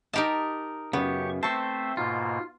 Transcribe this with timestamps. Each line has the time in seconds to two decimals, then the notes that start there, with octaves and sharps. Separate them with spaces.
0.13 D#4 G4 A#4 D#5 A5
0.93 F#2 C#3 B3 G4 C#6
1.43 A3 C4 C5 E5 A5 C#6
1.97 G#2 B2 A#3 F4